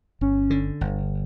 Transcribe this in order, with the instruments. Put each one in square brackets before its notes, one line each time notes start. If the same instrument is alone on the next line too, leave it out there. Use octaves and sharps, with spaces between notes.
[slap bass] G1 [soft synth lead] C#4
[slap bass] D3
G1